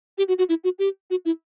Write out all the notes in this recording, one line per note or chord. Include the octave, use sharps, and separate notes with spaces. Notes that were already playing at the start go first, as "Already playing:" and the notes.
G4
F#4
F#4
E4
F#4
G4
F#4
E4